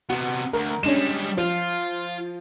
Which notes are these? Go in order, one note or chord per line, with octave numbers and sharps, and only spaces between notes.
C3 B3 F#4
D2 A#4
G3 G#3 C#4 D4 E7
F3 F4